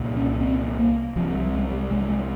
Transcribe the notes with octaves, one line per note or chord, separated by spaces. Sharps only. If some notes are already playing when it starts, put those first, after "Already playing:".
Already playing: C2 A#2
C#4
C4
A#3
C2 C3 F3
G3
G#3
G3
G#3
G#3